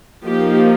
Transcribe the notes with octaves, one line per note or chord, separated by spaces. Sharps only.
F3 A#3 D#4 G4